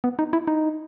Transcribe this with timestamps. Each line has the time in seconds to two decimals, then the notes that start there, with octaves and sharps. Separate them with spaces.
0.04 B3
0.19 D#4
0.33 E4
0.47 D#4